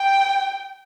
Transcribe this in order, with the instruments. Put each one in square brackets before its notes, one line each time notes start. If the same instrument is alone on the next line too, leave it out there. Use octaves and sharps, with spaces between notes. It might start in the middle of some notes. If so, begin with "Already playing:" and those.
Already playing: [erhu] G5